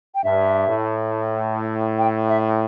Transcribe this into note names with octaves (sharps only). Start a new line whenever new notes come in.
G5
G2 E5
A2
G5
E5